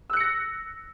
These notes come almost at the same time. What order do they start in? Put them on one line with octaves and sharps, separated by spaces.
E6 F#6 C#7 A#6